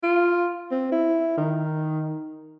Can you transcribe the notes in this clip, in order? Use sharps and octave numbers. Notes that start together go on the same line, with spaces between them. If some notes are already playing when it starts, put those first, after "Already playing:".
F4
C4
E4
D#3